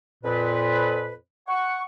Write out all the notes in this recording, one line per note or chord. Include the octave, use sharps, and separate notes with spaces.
F2 A#2 B4
F#5 C#6